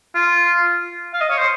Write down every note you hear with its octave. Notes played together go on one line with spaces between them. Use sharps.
F4
F5
D#5
C#5
C5